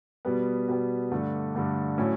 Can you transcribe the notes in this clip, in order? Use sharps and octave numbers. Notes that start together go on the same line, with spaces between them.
B2 G3 B3
B2 G3 B3
G2 D3 A3 D4
G2 D3 A3 D4
A2 F#3 C#4 E4